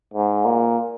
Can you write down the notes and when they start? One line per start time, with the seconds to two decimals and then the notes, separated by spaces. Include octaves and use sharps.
0.13 G#2
0.45 A#2